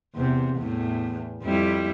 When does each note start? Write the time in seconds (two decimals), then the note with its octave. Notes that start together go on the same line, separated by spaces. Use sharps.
0.15 E2 C3
0.56 E2 A2
1.43 F2 G3 E4